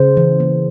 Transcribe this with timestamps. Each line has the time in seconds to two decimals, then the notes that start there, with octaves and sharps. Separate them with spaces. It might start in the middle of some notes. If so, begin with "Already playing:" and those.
Already playing: C#3 C5
0.17 E3
0.40 A#3